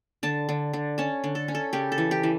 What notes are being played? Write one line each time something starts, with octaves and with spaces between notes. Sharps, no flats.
D3 A5
D3
D3
C#4 A5
D3
A4
C#4
A4
C#3 G4
A4
E3
G4
E3